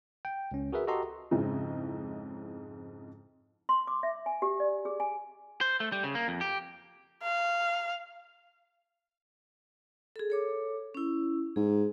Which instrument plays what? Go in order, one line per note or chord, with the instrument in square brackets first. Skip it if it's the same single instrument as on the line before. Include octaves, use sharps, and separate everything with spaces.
[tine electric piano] G5
C#2 C#4
F#4 G#4 A#4 B4 E5
F#4 G4 A4 D#5 A#5 C6
[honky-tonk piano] F2 G#2 C#3 D#4 E4
[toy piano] C6
D6
E5
G#5
G4
D5
G#4
G#5
[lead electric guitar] C5
A3
G3
C#3
A#3
F2
G4
[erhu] F5
[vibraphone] G#4 A4
A4 C#5 D6
C#4 E4
[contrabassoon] G#2 [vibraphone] G#4